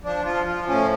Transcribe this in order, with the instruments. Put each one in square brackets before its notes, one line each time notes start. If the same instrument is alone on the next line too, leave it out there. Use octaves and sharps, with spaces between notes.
[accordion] F3 D4
F3 F4
F3 F4
A2 C#4